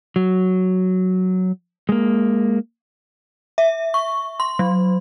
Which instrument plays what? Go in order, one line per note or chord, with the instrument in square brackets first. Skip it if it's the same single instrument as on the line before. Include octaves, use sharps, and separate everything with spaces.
[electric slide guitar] F#3
G#3 A#3
[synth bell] E5
C#6
C6
F#3